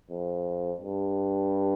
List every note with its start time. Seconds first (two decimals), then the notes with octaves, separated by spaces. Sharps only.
0.11 F2
0.80 G2